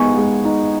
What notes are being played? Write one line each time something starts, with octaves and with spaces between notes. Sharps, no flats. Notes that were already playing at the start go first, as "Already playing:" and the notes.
Already playing: G#3 B3 D#4 G#5 C#6
G#3
D#4